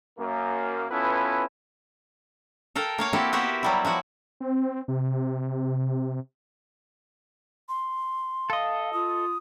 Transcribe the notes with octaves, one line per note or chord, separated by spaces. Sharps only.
F#2 A#3
B3 C#4 E4 F4 A4 B4
A4 A#4 F5 G5
A#3 C#5 F5
A#3 C4 E4 F#4 G4 A4
B3 F#4 G4 A#4 C5 E5
F#3 G3 E4
F3 E4 F#4
C4
C3
C6
A4 D#5 F5
F4 D#6